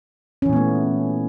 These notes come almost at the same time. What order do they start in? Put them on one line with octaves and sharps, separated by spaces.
C#4 E3 A#2 B3 A3